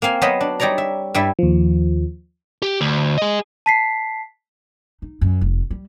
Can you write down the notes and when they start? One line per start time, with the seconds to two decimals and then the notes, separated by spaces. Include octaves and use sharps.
0.02 A#3 C4 F5 G#5
0.22 F#3 B3 C5 C#5 D#5 B5
0.41 D4
0.60 G3 D#4 C#5 D5 A#5
0.78 E5
1.14 G2 G3 E4 E5
1.39 D#2 F3
2.62 G4
2.81 D2
3.18 G#4 D#5
3.66 A5 B6 C7
5.02 D#4
5.21 F#2
5.41 F1
5.71 G3